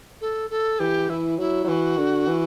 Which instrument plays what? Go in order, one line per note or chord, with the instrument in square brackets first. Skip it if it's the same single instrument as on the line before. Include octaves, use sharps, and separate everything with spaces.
[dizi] A4
A4
[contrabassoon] E3 [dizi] G4
[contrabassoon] E3 [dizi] E4
[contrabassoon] F#3 [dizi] E4
[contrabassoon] F#3
[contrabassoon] E3 [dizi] F#4
[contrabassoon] D3
E3